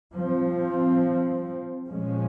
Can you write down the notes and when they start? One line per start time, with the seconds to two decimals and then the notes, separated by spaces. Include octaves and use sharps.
0.14 F3 C4
1.86 A#2 F3 G#3 C#4